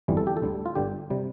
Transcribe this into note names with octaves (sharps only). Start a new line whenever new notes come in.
G1 F2 E3 G3
A4
G4
A4
D2 D3 G3
F4
G1 G2 D3 G4
C3 G3